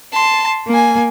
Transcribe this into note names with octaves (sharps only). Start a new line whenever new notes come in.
A5 C6
A#3 G#5